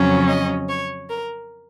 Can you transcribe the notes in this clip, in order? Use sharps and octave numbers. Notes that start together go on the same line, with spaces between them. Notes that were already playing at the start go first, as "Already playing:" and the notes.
Already playing: F2 C#3 F#3 C#4
D#5
C#5
A#4